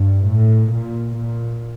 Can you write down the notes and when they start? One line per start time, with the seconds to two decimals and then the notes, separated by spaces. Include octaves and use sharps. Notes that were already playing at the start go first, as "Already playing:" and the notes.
Already playing: G2
0.30 A2
0.73 A#2
1.17 A#2